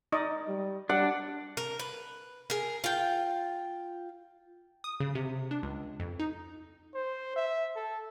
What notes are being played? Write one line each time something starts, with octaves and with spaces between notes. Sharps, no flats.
D#4 D5 D#5
G3
G3 D4 F#5
A#4
B4
G#4 A#4
F4 G5
D#6
C#3
C3
D4
C#2
F2
D#4
C5
E5
A4